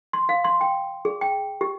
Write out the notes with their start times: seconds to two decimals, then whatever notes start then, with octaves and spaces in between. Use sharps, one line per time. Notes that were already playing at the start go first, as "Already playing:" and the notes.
0.13 C6
0.29 F5
0.44 C6
0.61 G5
1.05 G#4
1.21 G5
1.61 G4